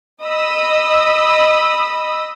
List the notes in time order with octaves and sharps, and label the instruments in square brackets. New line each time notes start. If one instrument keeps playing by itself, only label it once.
[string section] D#5 B5 D#6 E6